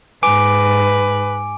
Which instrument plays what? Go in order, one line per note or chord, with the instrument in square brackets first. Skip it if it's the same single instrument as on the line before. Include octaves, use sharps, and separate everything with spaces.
[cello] G#2 [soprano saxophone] B4 [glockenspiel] G#5 D6 D7